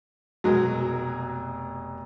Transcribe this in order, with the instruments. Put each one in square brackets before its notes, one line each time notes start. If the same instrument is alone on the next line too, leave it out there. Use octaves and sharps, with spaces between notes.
[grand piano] F1 B2 A#4 [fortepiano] F#3 G#3